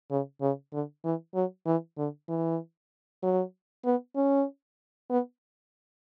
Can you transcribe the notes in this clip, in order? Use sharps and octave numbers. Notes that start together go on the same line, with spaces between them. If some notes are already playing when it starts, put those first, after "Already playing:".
C#3
C#3
D3
E3
F#3
E3
D3
E3
F#3
B3
C#4
B3